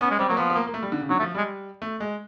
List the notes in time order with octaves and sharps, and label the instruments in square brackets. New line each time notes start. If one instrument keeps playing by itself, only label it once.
[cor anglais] B3 [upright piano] C#4
[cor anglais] G#3
[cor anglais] G3 [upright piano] C4
[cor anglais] F#3 [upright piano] A#3
[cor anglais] F3 [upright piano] B3
[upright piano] B3
A#3
A#3
A3
G3
D3
C#3
[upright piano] D3 [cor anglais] F#3
[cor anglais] A3
[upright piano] F3
[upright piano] G3 [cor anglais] G#3
[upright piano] A3
G#3